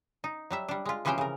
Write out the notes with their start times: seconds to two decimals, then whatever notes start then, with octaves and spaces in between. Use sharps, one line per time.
0.24 D#4
0.51 F#3 G3 E5
0.68 G3 D4
0.85 G#3 F4
1.05 C3 E3 F3 C#4 C5 G5
1.18 C#3 A#4